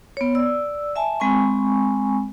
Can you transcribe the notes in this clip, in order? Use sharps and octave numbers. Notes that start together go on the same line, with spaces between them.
B3 C#5
D5 E6
E5 G#5 A5
G#3 C4 G#5 B5 C#6